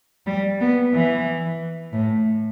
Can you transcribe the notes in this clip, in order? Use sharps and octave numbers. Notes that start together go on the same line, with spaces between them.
G3
B3
E3
A2